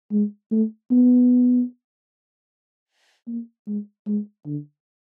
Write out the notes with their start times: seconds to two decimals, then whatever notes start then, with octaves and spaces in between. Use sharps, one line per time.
0.12 G#3
0.52 A3
0.91 B3
3.28 A#3
3.67 G#3
4.07 G#3
4.46 D3